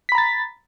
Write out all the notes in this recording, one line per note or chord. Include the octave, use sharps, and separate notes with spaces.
A#5 B5 A6 B6